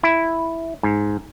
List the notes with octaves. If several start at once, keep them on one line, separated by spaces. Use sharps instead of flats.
E4
G#2